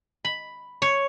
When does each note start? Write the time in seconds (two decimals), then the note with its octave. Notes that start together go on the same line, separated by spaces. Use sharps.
0.25 B5
0.82 C#5